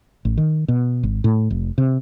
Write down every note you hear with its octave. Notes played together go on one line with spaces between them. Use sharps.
A1
D#3
B2
G#1
A2
F1
C3